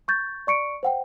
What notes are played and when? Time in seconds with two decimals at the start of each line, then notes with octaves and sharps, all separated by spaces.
0.08 C#6 G6 A6
0.47 D5 C#6 C#7 D7
0.83 C5 F#5 G5